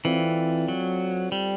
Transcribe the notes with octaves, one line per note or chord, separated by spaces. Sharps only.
E3 C4 F4 A4 D5
F#3
G3